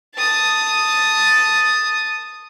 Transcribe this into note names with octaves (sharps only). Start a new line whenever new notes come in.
A5 D#6